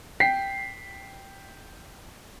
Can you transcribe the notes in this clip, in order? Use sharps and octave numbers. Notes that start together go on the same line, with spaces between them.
G5 B6 C7